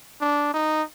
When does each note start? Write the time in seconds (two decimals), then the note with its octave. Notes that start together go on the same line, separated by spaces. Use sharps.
0.21 D4
0.54 D#4